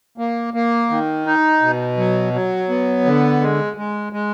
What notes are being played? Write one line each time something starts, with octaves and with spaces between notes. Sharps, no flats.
A#3
A#3
D#3
D#4
B2
F#3
F#3
B3
D3
G#3
G#3
G#3